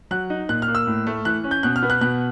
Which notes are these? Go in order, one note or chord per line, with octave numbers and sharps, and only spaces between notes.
F#3 F#6
D#4
A#2 F#6
F6
A#3
E6
A2
A3
E3 F#6
C#4
G6
B2 F#6
F6
B3
F#6
B2 F#6